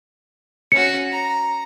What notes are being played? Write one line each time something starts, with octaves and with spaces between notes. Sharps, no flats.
C#4 F#4 C#7
A#5